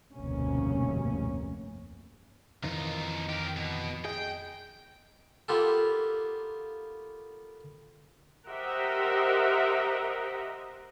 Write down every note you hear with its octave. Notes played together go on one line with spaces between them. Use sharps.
F1 D2 G2 B2 A#3 C#4
F2 D#3 E3 D#4 F4
G4 A#4
B2
G#4 D#5 G5
A#3 B3 F4 G4 A4
G4 A#4 C5 D#5 E5 F#5